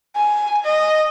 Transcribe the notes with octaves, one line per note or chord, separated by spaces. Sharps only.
G#5
D#5